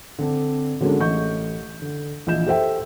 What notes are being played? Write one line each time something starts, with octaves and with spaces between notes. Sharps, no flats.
D3 C4 D4
D3 F#3 G#3 A#3 C#4 D4
A1 A3 D#5 C#6 G6
D3
A#1 E3 D#5 G6 E7
G4 A4 C5 E5 G5